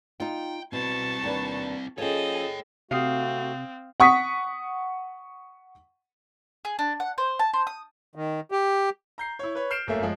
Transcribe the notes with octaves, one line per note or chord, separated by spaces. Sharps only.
D#4 F4 G5
B2 C4 E4 A5 C#6
D#2 D4 B4
F3 C#4 G#4 A4 C#5 D#5 G5
C3 A3 C4 F#4 F5 D#6
F#5 C#6 D#6 B6
G#4
D4
F#5
C5
A5
C5
D#6
D#3
G4
A#5 G6 C7
E4 C#5
B4 C#5
F6 G6 C7 D7 E7
G1 F#2 A3 A#3 E5
F3 G#3